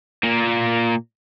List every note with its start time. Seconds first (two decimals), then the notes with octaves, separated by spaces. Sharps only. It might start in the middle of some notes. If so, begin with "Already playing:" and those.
0.23 A#2 A#3